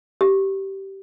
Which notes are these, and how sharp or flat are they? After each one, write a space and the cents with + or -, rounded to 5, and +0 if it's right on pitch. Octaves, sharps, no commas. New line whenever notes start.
G4 -15